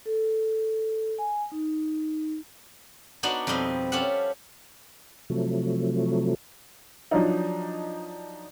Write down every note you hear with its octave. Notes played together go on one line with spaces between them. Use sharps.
A4
G#5
D#4
B3 D4 D#4 F#4 D5 F#5
F2 B2 G3 C4 D#5
C#4 F4 G4 A4 E5 F#5
C3 F3 F#3 A3
F3 F#3 D4 D#4